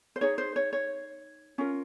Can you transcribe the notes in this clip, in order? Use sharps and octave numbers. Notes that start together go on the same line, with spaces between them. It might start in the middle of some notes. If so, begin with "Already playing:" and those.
C5
D#4 G#4 C#5
C5
C#5
C#5
C#4 F4 A#4